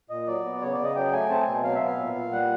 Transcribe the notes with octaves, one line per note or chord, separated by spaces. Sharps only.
A#2 D#5
F#3 D5
B3
C#3 C#5
D5
C#3
D#5
F#3 G5
A3 G#5
C4 A5
G#5
B2
F#3 F5
E5
B3
F5
A#2
A#2
G3 F#5